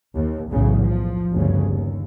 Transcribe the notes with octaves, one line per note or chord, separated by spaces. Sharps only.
D#2
B1 E2 A2 C#3
F3
G1 D2 G2 C#3
D#2